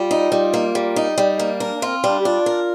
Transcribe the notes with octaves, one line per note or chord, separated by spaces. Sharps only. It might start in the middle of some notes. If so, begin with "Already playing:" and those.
Already playing: G3 F4
D#4
G3
A#3
G3
D#4
G3
A#3
D4 A#4
D4
C4 F4
G3 D4
G4
D4 F4
A#4